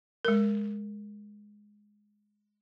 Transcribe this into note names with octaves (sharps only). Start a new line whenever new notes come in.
G#3 A#4